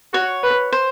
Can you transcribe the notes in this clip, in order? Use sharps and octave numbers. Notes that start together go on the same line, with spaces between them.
F#4 C#5
B4
C5